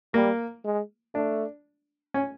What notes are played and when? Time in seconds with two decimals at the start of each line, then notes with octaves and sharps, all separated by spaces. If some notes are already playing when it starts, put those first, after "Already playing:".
0.14 G3 A#3
0.64 G#3
1.14 A3 D4
2.14 C#4